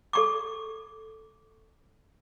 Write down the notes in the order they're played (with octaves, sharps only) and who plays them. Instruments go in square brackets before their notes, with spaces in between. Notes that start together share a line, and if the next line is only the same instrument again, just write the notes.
[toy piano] A4 C#6 D6